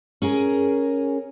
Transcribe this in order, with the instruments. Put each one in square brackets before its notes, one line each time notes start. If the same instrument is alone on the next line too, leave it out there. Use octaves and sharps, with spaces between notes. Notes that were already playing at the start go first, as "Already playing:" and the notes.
[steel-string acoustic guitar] C#4 G#4 A#4